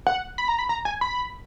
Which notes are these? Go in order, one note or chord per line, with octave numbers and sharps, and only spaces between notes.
F#5
B5
A#5
B5
A#5
G#5
B5